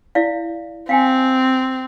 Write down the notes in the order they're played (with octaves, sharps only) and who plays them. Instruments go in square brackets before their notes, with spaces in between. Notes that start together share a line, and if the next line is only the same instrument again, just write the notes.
[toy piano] E4 D5 F5
[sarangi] C4 [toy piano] F5 G5 G#5